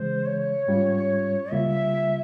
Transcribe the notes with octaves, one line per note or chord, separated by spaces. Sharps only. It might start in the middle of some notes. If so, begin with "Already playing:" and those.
Already playing: C#3 E3 G#3 C5
C#5
G#2 G3 C#4 F4
C#2 C#3 G3 A#3 F4 E5